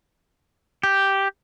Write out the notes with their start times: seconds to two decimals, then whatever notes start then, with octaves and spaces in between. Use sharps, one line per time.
0.83 G4